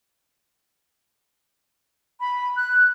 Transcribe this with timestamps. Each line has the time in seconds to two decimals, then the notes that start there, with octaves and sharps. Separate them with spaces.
2.20 B5
2.56 F#6